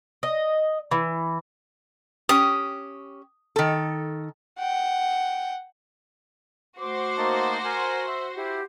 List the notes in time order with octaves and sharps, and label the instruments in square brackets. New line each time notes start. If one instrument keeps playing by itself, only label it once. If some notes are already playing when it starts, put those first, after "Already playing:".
[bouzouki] D#5
E3
[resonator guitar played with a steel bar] C#4 G4 [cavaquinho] D#6
[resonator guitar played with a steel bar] D#3 A4
[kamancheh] F#5 G5
[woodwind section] A3 C6 D6 [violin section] F#4 C5
[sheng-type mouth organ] A#3 D#4 A5
A#4 G#5
[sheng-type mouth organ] E5 [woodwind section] C6
[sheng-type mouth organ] E4 [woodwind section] G4